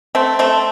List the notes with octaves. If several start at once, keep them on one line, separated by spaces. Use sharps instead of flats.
A3 C4
A3 C4